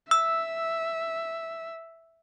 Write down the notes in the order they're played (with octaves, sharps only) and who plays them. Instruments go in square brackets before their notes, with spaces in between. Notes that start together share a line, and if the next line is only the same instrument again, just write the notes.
[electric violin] E5 [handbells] E6